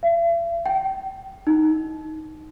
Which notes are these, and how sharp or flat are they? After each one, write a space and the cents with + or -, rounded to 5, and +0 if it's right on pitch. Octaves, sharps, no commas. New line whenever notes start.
E5 +45
G5 -30
D#4 +5